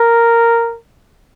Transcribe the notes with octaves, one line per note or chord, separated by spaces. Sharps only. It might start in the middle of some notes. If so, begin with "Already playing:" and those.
Already playing: A#4